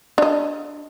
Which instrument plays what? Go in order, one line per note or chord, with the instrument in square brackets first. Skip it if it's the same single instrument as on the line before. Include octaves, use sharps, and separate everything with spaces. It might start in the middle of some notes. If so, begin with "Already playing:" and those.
[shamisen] D4 D#5